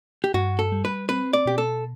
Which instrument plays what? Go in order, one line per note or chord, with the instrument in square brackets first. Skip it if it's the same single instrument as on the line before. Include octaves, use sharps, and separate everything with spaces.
[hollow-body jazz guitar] G4
[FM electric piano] G2 [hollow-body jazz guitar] F#4
[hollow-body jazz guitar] A4
[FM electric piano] G3
[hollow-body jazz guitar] B4
[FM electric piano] C4 [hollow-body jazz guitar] B4
[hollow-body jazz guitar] D5
[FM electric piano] B2 [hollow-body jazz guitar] G4
[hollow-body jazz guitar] A4